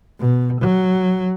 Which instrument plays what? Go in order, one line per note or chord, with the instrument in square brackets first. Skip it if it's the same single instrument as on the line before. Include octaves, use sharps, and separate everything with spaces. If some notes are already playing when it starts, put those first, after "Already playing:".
[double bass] B2
F#3